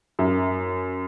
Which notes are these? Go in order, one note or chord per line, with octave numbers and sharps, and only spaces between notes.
F#2